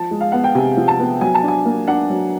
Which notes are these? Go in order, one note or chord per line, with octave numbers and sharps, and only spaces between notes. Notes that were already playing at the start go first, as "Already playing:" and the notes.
Already playing: F3 A5
G#3
F5
B3 F#5
G5
C3 G#5
F3
A5
B3
F#3 G#5
A5
D4 G#5
A#3
D4 F#5
F#3